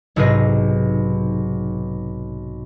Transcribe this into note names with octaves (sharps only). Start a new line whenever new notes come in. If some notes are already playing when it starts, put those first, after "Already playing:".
B1 G#2 C3 G#4 B4 A#6